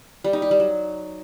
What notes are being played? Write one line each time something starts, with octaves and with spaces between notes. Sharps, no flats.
G3
D#4
G4
G3
F#3